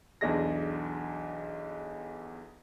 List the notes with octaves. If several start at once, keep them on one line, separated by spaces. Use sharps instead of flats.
B1 E2 D4 G#4 A#6